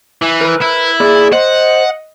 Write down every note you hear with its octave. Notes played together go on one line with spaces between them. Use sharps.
E3
A#4 B4
E4 B5
A#3 G#4 D5
C5 D#5 F#5